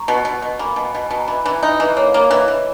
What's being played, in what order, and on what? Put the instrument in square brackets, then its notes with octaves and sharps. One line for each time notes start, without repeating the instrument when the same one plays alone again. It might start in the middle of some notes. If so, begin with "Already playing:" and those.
Already playing: [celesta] A#5 C#6
[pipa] B2
B2
B2
[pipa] A#3 [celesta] G#5 B5
[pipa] B2
B2
[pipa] B2 [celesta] G#5
[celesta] A#5
[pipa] E3 [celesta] G#5 B5
[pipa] E3
[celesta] A#5
[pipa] D#4 [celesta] E5 G#5
[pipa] E3 [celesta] B4 D#5
[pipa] A#3 [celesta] C#5
[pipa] A#3 [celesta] C#5
[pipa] E3 [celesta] B4 D#5
[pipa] E3